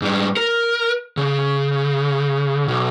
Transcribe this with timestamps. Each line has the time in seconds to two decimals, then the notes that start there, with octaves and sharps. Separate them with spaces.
0.02 G#2 G3
0.37 A#4
1.17 C#3
2.68 B1